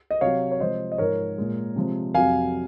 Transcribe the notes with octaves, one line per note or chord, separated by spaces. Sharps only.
D#5
C3 F#3 C#5 F5
C#5
C3 F3 G#3 C5 D#5
D#5
G#2 F3 G#3 A#4 C#5
A#2 G#3
C3 F3 G#3
F2 C3 F#3 F5 G#5